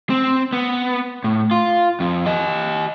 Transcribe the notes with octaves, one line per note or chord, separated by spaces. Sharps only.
C4
B3
A2
F4
F2
G4 D#5